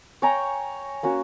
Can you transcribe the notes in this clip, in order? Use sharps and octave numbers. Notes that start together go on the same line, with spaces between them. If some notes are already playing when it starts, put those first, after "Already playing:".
C#5 G5 G#5 A#5
A#3 C#4 F#4